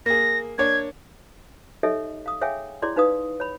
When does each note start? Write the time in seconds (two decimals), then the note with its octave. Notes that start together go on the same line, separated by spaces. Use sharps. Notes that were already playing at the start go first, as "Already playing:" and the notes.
0.06 A#3 G#4 A#6
0.58 A#3 D4 C#5 G#6
1.83 D#4 G4 A4 C#5 D#5 E5
2.26 F5 D#6
2.41 G#4 C#5 E5 F5 G5 G#5
2.82 E4 G#4 C#5 D5 C6
2.96 D#4 B4 F5 D#6
3.40 C#5 B5